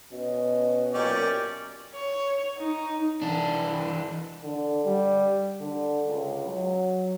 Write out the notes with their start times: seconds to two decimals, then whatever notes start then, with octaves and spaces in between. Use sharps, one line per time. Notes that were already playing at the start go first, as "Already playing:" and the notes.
0.12 B2 C#4 F#4 D#5
0.94 F#2 A#2 C#4 G4 A#4 D5
1.95 C#5
2.57 D#4
3.22 E3 D4
4.43 D3
4.85 G3
5.60 D3
6.07 C#2
6.46 F#3